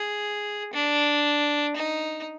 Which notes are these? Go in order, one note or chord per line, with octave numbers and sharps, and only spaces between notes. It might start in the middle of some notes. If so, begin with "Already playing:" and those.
Already playing: G#4
D4
D#4